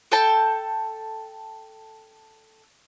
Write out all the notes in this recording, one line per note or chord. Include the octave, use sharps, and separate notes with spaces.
A4 G5 A5